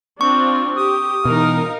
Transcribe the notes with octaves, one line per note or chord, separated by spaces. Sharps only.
C4 D4 F4 C#6
G4 D#6
B2 E3 D#4 A#4 F5